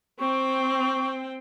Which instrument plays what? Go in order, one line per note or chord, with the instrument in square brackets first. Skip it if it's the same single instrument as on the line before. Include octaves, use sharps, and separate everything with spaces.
[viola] C4 G5 [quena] C#6